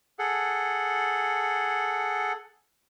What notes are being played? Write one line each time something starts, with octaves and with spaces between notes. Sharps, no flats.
G#4 A4 F#5